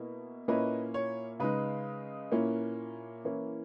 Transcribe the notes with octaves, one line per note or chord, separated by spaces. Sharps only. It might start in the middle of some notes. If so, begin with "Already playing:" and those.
Already playing: B2 A#3 E4
A#2 A#3 C#4 E4 B4 D#5
C#5
C#3 G#3 D#4 B4
A#2 A#3 C#4 E4
E3 A#3 C#4 E4